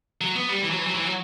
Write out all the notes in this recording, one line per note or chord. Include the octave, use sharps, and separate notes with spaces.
F#3
B3
G3
E3
F#3
E3
F#3
E3
F#3